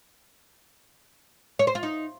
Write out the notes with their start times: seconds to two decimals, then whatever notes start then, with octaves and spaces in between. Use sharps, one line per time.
1.59 C#5
1.67 C5
1.75 F4
1.83 D#4